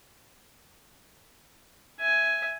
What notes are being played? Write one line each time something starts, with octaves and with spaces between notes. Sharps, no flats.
E5 G#5